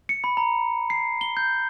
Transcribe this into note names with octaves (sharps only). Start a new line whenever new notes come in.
C#7
B5
A#5
C7
G7
G6